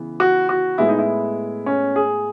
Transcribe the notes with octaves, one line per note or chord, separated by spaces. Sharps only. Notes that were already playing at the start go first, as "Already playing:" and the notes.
Already playing: C#3 E3 B3
F#4
F#4
A2 G#3 B3 E4
D#4
E4
C#4
G#4